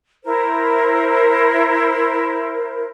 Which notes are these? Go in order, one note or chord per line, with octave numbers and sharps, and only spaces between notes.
E4 A#4 C5